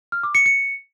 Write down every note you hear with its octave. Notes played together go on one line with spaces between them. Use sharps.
F6
D6
C#7
C#7